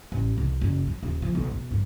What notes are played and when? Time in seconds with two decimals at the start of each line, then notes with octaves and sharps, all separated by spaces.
0.12 A1
0.38 C2
0.61 F#1
0.87 F#3
1.03 D#1
1.22 F3
1.35 B1
1.51 B1
1.71 G2